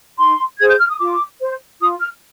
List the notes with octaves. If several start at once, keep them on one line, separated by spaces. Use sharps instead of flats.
D#4 C6
G#4 C5 G#6
G6
F6
D#6
F4 D6
C5
F4 D#6
F6